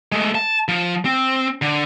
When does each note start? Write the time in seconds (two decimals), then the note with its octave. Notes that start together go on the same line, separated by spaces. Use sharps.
0.12 G#3 A3
0.35 A5
0.68 F3
1.05 C4
1.62 D3